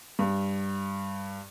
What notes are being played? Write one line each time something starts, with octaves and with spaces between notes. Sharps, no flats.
G2